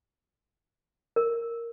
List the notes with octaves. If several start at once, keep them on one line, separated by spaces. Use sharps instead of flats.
A#4